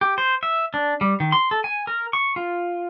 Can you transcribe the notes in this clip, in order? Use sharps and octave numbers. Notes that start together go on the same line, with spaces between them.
G4
C5
E5
D4
G3
D#3
C6
A4
G#5
A#4
C#6
F4